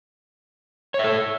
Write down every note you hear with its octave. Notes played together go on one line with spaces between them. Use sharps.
A4 C#5 E5